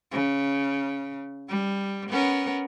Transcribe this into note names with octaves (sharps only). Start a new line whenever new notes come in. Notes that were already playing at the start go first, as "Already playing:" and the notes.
C#3
G3
B3 C#4 A#4